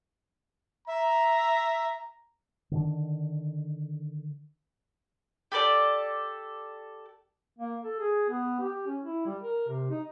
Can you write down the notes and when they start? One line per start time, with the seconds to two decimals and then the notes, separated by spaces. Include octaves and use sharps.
0.87 E5 A#5
2.71 D3 D#3 D4
5.52 G4 A4 A#4 D5
7.58 A#3
7.84 A4
8.00 G#4
8.30 B3
8.60 G4
8.87 C#4
9.02 E4
9.26 G3
9.42 A#4
9.68 C3
9.90 D#4